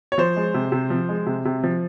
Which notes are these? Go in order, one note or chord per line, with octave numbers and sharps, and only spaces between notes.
C#5
F3 C5
G#3
C3
C3
F3
G#3
C3
C3
F3